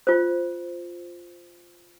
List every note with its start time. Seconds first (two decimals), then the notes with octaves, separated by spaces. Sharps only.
0.07 F4 C5